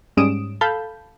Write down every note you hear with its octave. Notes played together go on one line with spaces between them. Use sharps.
G#2 G3 C#4 D#6 D7 E7
A4 F5 A5 B5 G6